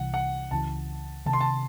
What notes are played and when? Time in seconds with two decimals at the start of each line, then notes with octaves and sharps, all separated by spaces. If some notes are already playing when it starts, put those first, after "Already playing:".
Already playing: C2 C3 E3 F#5
0.14 F#5
0.51 C#2 C#3 E3 A5
1.26 C3 D#3 A3 A5
1.33 C6
1.41 A5